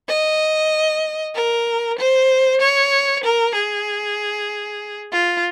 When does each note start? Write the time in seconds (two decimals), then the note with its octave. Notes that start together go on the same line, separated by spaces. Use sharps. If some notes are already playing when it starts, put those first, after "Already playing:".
0.09 D#5
1.35 A#4
1.99 C5
2.61 C#5
3.23 A#4
3.55 G#4
5.13 F4